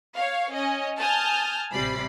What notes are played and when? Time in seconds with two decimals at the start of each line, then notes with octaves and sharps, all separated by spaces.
0.15 C#5 F5
0.52 C#4 D#5
0.99 G#5 A5 D#6 F6 G6
1.72 A1 C3 G3 D5 B5 C7